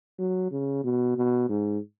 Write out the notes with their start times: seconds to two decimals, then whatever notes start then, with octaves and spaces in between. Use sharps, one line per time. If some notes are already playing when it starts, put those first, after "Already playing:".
0.19 F#3
0.51 C#3
0.84 B2
1.17 B2
1.49 G#2